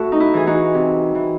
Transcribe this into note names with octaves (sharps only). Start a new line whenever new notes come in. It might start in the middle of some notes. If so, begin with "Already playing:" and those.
Already playing: A2 F#4 A4
D#4
E4
E3 G#4
D#4 F#4
C3
E3